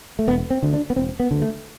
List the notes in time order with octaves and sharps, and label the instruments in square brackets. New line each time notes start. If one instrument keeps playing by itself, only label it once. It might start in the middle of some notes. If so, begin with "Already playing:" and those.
[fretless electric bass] A3
E1 B3
C4
D2 D3
D4
B3
E1 C4
B3
D2 D3
A3